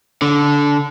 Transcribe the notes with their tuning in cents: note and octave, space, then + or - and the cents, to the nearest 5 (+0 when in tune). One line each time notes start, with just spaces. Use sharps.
D3 -20